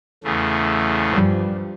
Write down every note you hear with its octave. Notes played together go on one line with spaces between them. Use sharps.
E2 C#3 A3
G2 F3 G3